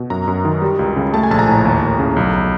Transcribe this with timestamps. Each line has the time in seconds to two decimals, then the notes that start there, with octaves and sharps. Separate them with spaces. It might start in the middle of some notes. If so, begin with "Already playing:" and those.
Already playing: B2
0.10 F#2 A#5
0.28 F#2
0.45 D#3
0.62 G3
0.79 C#2
0.96 C#3
1.14 A3 A5
1.23 G#5
1.31 A#1 A5
1.39 A#5
1.48 A2
1.65 D#2
1.82 D#2
1.99 C#3
2.17 B1